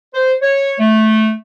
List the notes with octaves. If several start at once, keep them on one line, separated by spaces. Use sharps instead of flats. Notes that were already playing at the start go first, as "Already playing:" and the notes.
C5
C#5
A3